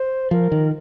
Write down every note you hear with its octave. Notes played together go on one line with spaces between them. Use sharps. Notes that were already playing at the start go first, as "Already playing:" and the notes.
Already playing: C5
F3 A#4
D#3